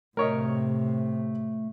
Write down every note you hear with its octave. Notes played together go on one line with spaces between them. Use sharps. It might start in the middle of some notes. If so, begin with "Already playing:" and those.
A2 C3 A3 A#4 C#5 D#5